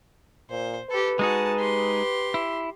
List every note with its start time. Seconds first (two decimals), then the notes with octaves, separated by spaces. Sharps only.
0.50 A#2 C5
0.90 G4 A4 B4
1.19 G#3 D#4 F#4 G#4 A5
1.59 G4 C6
2.34 E4